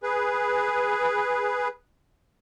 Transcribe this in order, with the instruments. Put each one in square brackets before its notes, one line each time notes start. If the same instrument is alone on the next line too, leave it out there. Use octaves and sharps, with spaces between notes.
[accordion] G#4 B4